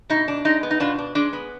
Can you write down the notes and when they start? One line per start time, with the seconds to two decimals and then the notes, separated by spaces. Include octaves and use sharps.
0.10 B2 D#4
0.28 D4
0.45 G#3 D#4
0.63 B3
0.71 D#4
0.80 B2 D4 F4
0.98 D4
1.15 G#3 D4
1.33 B3